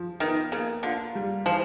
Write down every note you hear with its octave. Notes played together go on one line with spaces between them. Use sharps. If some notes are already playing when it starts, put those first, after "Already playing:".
Already playing: F3
D#3 B3
C#3 A#3
D3 F4
G3
E3 F3